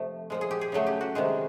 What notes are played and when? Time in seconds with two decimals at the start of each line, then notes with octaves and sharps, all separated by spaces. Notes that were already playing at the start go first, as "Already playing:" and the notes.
Already playing: C3 F3 A3
0.30 A#2 F3 G#3
0.41 G#4
0.51 G4
0.61 G#4
0.72 C#3 F#3 A3
0.87 G4
1.01 F#4
1.15 C3 D#3 G#3